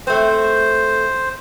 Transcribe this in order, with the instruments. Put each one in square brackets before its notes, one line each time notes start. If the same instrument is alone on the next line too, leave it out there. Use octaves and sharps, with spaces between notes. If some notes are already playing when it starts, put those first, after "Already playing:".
[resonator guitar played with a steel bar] A3 C4 [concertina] C5